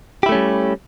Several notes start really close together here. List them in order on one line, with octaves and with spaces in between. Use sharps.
G4 E4 A3 C#4 G3